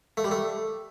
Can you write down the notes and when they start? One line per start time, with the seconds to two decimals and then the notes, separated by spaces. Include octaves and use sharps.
0.17 A3
0.24 G3
0.31 A3